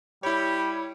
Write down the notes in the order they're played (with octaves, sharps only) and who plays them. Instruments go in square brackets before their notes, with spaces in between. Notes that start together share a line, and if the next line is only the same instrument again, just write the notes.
[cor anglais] G3 [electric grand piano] E4 C#5 [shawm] G4 [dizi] B5